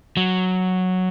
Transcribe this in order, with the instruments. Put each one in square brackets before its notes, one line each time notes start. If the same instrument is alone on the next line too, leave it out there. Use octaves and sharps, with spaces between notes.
[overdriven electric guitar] F#3